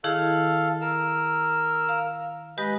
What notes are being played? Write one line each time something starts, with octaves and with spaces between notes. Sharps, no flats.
D#3 E4 G#4 A4 F5
A#4 E6
F5
G#3 G4 B4 D#5